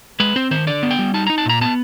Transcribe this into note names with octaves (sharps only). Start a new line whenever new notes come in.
G#3 B4
C4 C5
D#3 C5
D3 D5
B3
G5
G3
D#4 A5
D#4 A#5
A5
A#2 A#5
B3 A5